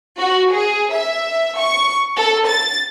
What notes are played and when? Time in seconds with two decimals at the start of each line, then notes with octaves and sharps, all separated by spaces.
0.19 F#4
0.53 G#4
0.93 E5
1.59 C#6
2.16 A4
2.47 A6